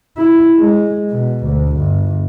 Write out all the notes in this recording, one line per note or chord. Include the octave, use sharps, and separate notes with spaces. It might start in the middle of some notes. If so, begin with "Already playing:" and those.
E4
G#3
B2
D2
G1